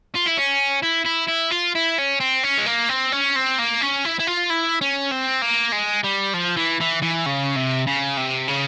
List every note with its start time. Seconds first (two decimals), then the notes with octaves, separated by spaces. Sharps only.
0.15 F4
0.26 E4
0.37 C#4
0.83 E4
1.06 E4
1.28 E4
1.51 F4
1.75 E4
1.99 C#4
2.20 C4
2.44 C#4
2.58 G#3
2.66 A#3
2.89 C4
3.12 C#4
3.36 C4
3.59 A#3
3.82 C#4
4.05 E4
4.20 E4
4.27 F4
4.50 E4
4.81 C#4
5.11 C4
5.42 A#3
5.72 G#3
6.04 G3
6.33 F3
6.57 E3
6.81 E3
7.02 E3
7.26 C#3
7.56 C3
7.87 C#3
8.17 C3
8.48 C#3